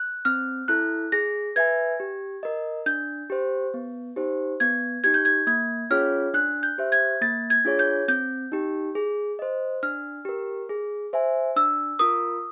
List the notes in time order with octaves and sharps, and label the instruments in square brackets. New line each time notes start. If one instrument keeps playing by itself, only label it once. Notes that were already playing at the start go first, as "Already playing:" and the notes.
Already playing: [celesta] F#6
[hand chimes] C4 [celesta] F6
[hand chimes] E4 A4 [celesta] F#6
[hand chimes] G#4 [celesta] A#6
[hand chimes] B4 E5 G#5 [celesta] G#6
[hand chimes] G4
A#4 D#5
[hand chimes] D4 [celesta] G6
[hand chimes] G4 C5
B3
D#4 G4 C5
[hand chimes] B3 [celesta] G#6
[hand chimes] D#4 G4 [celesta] G#6
[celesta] G6
G#6
[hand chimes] A#3 [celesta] G#6
[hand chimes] C#4 F4 G#4 C#5 [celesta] F6
[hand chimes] D4 [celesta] F#6
[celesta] G6
[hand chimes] G4 C5 E5
[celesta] G#6
[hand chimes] A#3 [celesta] A6
[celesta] G#6
[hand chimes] D4 F4 G#4 C#5
[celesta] G6
[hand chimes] C4 [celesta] G6
[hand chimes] D#4 G4
G#4
C5 D#5
[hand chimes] D4 [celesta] F6
[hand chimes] G4 A#4
G#4
C5 E5 G#5
[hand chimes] D4 [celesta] E6
[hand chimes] F4 A#4 [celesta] D#6